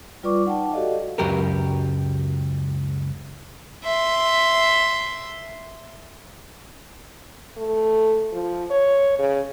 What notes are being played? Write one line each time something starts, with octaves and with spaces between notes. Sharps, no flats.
G3 F4 B4 D5 C#6 D6
D#4 F#5 G5 A5
F#4 G4 A4 D5 D#5 F5
C#2 F#2 F#3 G4 A#4 B4
E5 C6
A3
F3
C#5
C#3